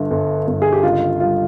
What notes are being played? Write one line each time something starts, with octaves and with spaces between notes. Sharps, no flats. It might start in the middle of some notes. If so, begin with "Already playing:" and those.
Already playing: G1 G2
G1
G1
G#4
G4
C#2 F4
G3 F4